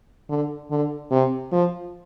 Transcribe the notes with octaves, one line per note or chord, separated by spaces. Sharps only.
D3
D3
C3
F3